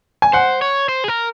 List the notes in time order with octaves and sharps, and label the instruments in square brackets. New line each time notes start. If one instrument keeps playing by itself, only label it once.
[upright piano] G#5
[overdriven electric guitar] C5 [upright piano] F#5
[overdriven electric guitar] C#5
C5
G#4
A#4